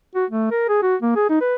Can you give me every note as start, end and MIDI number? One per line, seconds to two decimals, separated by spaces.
0.15 0.25 66
0.30 0.51 57
0.51 0.65 70
0.69 0.81 68
0.82 0.95 66
1.02 1.12 58
1.16 1.26 68
1.29 1.40 63
1.41 1.56 71